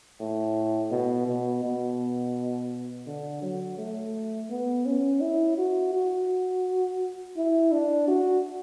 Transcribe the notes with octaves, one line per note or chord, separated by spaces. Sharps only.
A2
B2
B2
B2
D3
F#3
A3
B3
C#4
E4
F#4
F#4
E4
D4
F#4